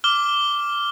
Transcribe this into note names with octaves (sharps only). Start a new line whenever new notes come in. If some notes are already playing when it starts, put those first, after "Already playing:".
D6 F6 G7